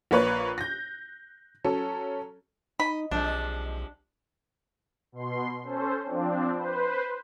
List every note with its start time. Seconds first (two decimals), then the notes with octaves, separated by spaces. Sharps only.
0.11 A#1 A#3 B4 C#5 F#6
0.58 G6 A#6
1.65 F#3 C#4 A4
2.80 D#4 D#5 B5
3.11 B1 C3 F3 G#3 D4
5.12 B2 C6
5.63 C#4 A4 C5
6.05 F3 C4 D4
6.53 B4 C5